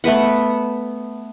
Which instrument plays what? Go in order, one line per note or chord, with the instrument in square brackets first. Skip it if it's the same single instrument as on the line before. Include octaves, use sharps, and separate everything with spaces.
[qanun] A3 B3 B4 F#5